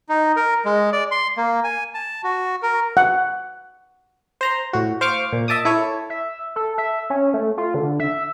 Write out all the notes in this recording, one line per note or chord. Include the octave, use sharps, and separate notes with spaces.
D#4
A#4
G#3
D5
C6
A#3
G#5
A5
F#4
A#4
F#5
C5 A#5 C6
A2 F#4
C5 F5 C#6 D6 F6
A#2
D#5 E5 A5 D6 D#6
E4 A4 C#5
E5
A4
E5
C#4
A3
F4
D3
E5